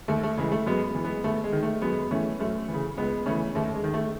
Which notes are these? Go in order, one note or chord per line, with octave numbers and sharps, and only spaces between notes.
D#2 A3
A3
C#3 E3 G#3
A3
F#2 G#3 B3
E3
G#3 B3
D#2 A3
G#3
D#3
A3
F#2 G#3 B3
E3 A3 C#4
F#2 A3
C#3 E3
C#2 G#3 B3
C#3 E3 A3 C#4
D#2 A3
G#3
D#3
A3